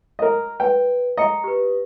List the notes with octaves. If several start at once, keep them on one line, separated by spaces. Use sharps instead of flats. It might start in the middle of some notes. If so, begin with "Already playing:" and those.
A#4 D#5
B4 G5
D#5 A#5 C#7
G4 B4